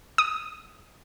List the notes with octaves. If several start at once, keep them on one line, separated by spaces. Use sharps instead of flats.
D#6